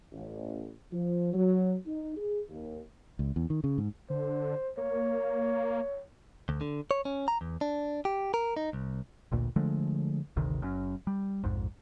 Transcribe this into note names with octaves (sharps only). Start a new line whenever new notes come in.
A1
F3
F#3
D#4
G#4
D#2
C#2
E2
D#3
C#3
G#2
D3 C5
A#3 C#5
D2
D3
C#5
C#4
A#5
E2
D4
G4
A#4
D#4
C2
A1 D2 A#2
D3 F3 G#3 A3
G#1 D2 C3 D#3
F#1 F#2 F#3 C#4
G3
A#1 F2 G#2